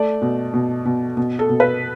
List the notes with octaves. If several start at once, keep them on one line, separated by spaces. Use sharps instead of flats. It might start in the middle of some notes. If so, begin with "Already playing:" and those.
Already playing: A3 D5
B2
B2
B2
B2
A4
B2
B4